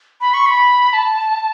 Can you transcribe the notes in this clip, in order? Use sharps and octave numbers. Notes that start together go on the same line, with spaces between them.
B5
C#6
B5
A5